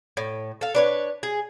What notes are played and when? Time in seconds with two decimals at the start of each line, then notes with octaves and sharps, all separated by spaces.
0.17 A2
0.61 A4 F5
0.75 D4 B4 C#5
1.23 G#4